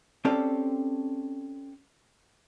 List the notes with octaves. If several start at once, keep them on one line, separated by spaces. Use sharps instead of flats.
C4 C#4 G4 A4 C5 D5